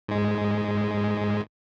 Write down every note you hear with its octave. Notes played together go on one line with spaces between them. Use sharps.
G#2 G#3